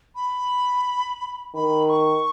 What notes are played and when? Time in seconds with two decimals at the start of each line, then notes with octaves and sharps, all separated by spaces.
0.16 B5
1.55 D#3 B5
1.90 C#6